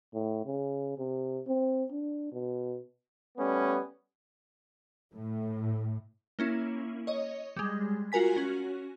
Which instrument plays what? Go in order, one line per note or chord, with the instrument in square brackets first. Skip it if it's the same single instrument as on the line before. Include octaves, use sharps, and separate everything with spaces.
[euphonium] A2
C#3
C3
C4
D4
B2
[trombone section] G3 A3 B3 C#4
[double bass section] A2
[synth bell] A#3 C#4 E4
C#5 D#5
G3 G#3
F4 F#4 A#4 G#5 B6
C#4 F#4